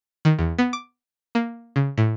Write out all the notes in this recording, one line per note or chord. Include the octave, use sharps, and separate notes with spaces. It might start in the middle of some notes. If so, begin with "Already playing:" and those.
D#3
E2
B3
D6
A#3
C#3
A2